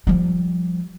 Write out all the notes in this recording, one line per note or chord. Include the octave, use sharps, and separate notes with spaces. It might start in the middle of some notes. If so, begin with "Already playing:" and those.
F3 G3